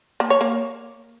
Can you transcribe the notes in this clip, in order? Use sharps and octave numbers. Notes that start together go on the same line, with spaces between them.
A#3
C#5
A#3